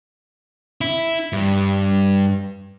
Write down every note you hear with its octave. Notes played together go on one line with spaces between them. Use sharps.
E4
G2